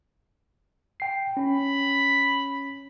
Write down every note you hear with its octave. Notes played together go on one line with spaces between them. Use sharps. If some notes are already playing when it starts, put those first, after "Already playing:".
G5 C7
C#4 B5